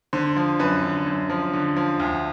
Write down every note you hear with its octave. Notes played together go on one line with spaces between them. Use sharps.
D3 C5
F3
F#2 B4
D3
F#2
F3
D3
F3
D2